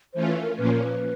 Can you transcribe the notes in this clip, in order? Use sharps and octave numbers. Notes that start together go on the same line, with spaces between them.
E3 A3 C#4 F4 C5
B4
A#4
A#2 F3 A#3 C#4 B4
A#4
B4